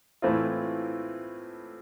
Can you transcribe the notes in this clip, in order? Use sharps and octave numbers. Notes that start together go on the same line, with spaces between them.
A2 E3 A3 C4 F4